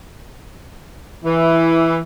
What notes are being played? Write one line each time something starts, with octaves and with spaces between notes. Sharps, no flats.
E3